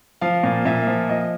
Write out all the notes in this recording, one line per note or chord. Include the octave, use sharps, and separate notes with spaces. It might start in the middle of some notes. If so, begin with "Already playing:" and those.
F3 F5
A#2
A#2 E5
F3
F3 D#5